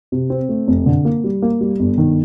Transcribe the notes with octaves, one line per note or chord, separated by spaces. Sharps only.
C3
C4
A3
F1
D3
A#3
G3
A#3
G3
G1
D#3